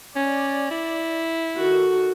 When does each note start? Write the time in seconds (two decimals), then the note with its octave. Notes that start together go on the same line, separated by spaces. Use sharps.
0.16 C#4 D5
0.71 E4
1.57 D#3 F#4 A4